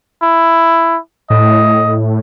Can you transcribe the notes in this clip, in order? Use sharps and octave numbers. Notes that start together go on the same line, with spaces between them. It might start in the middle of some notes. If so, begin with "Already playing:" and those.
E4
A2 D#5